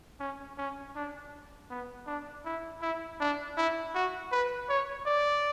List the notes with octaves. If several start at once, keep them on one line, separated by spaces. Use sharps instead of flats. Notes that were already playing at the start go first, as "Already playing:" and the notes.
C#4
C#4
D4
B3
D4
E4
E4
D4
E4
F#4
B4
C#5
D5